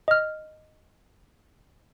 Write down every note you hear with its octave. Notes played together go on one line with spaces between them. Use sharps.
D#5 F6